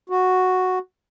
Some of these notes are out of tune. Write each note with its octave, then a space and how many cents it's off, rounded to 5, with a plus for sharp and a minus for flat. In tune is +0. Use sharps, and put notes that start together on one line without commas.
F#4 -5